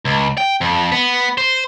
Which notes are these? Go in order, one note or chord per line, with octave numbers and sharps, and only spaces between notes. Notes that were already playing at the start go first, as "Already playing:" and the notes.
C#2
G5
F2
B3
C5